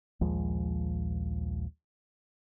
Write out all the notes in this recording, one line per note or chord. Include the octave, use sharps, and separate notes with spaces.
A#1 D#2 F3 G#3